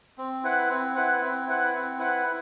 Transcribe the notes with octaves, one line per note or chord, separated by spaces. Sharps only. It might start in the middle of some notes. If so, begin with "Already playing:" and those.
C4
E4 B4 F#5
C4
E4 B4 F#5
C4
E4 B4 F#5
C4
E4 B4 F#5
E4